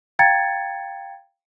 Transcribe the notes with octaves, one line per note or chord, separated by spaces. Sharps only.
F5 G5 A#5 G#6 A6 C#7